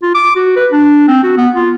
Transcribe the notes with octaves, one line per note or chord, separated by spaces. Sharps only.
F4
D6
F#4
B4
D4
C4
F#4
B3
F4